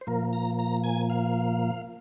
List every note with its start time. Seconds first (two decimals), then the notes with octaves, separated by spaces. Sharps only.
0.01 C5
0.07 A#2 F3 A#3 A#4
0.33 A#5
0.59 A#5
0.84 G#5
1.10 F5